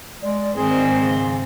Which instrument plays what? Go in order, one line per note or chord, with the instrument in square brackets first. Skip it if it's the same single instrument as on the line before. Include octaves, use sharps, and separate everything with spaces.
[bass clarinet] G#3 [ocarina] D5
[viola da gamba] G#2 D#3 C4 [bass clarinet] G#4 [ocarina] G#5
[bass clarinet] C#3